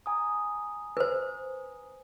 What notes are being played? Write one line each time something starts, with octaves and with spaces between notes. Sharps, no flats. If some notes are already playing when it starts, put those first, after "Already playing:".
G#5 A#5 D#6
B4 C5